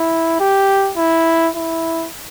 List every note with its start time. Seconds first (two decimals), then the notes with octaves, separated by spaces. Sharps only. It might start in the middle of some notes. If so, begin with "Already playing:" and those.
Already playing: E4
0.40 G4
0.97 E4
1.55 E4